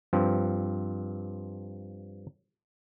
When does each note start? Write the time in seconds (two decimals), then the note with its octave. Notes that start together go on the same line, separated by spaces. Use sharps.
0.13 G2 F3 C4